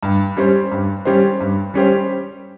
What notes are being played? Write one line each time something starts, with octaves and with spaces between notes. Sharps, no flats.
G2
G3 C#4 G4 C5
G2
G3 C#4 G4 C5
G2
G3 C#4 G4 C5